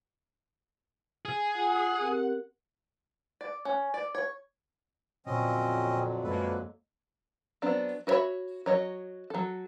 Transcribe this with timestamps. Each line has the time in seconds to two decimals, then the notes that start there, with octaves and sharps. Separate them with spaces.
1.25 G#4
1.55 F4 F#5 G#5
2.00 C4 G4 A#4
3.41 D5
3.65 C#4
3.94 D5
4.15 C#5
5.26 F2 A#2 D3 F#3 C4 C#4 D#5
6.24 F#2 G#3 A#3 A4 B4
7.62 F#3 B3 C4 D4
8.07 F#4 B4 C#5 E5 B5
8.66 F#3 C#5 D#5
9.30 F#3 A4